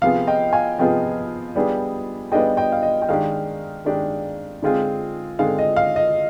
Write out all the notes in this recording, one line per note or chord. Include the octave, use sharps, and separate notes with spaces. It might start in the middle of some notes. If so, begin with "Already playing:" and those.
C3 F3 B3 F4 G#4 F5
D#5 G5
F5 G#5
C3 F3 B3 F4 G#4 D#5 G5
G3 B3 D4 F4 G#4
G3 B3 D4 F4 G#4 D#5 G5
D#5 G5
F5
D#5
G5
D#3 G#3 D4 G4 F5
D#3 G#3 D4 G4
D3 G#3 C4 F4 G#4
D3 G#3 C4 F4 G#4 F5
D#5
F5
D#5